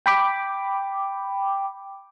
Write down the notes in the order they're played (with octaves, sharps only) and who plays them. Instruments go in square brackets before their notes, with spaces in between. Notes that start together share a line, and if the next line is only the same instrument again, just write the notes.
[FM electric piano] G5 B5 D6